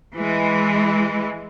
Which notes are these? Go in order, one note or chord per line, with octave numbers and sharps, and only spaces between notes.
E3 G#3